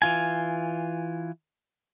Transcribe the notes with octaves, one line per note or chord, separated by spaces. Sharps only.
E3 F4 G#5